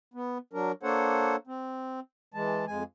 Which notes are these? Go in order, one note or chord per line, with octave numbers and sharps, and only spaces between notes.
B3
F#3 D4 A#4
A#3 D4 A4 C5 C#5 F#5
C4
E3 G#3 A5
F2 G#3 G#5